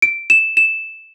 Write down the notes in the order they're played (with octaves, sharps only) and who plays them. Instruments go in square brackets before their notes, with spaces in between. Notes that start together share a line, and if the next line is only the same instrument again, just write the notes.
[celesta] D7
E7
E7